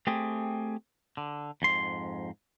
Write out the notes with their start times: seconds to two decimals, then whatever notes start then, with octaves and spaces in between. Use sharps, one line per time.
0.07 A3 C4 G4 G#4
1.17 D3
1.62 F2 G#2 C6